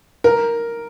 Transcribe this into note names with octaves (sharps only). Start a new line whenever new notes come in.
A#4